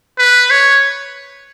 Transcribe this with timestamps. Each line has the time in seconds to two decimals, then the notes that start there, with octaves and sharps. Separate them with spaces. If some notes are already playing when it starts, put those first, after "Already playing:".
0.18 B4
0.51 C#5